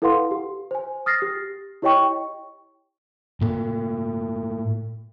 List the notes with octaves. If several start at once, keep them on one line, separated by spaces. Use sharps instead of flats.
E4 A4 B4 F5 F#5 C6
G4
C5 G#5
D#6 F6 A6 A#6 C7
G4
E4 G4 C#5 D#5 G5 C#6
A2 A#3